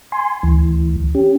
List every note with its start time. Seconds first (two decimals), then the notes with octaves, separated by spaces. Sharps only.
0.12 G#5 C6
0.43 D2 E3
1.15 C#4 G4